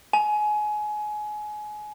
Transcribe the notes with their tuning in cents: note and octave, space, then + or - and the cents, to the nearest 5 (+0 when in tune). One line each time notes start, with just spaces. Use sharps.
G#5 +25